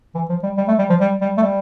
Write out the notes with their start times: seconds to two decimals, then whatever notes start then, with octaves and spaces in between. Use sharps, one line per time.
0.15 E3
0.29 F3
0.43 G3
0.58 G3
0.68 A3
0.79 G3
0.90 F3
1.00 G3
1.22 G3
1.38 A3
1.43 G3